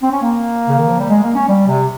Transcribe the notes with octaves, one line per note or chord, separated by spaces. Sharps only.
C4
C#4
A#3
C#3
D#3
F3
G3
G#3
A#3
C#4
G3
C3